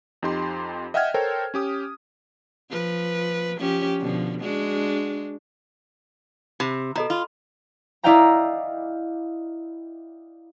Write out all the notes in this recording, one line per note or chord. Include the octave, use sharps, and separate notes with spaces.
F2 D#4 G4 C6
D#5 E5 F#5 G5 F6 G#6
A4 A#4 C5 C#5 G5
C#4 G4 D#6
F3 B4
F3 C#4 G4
B2 D3 F3
G#3 D4 F#4
C3 B5
B2 A4 D#5 A#5
F4 B5
E4 D5 D#5 F5 G5 A#5